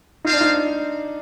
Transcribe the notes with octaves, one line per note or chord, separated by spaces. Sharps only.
C4 D#4 F4 C5 F5
D4
D#4